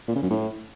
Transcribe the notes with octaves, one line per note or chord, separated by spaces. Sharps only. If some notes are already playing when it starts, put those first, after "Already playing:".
A#2
C#3
F#2
A2